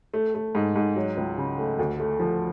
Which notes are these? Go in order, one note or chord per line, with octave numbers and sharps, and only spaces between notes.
A3
A3
G#2
G#2
F#3
C#2
C#3
A3
D2
A3
F3